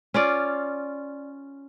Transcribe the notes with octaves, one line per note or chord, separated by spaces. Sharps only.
C#4 F4 D5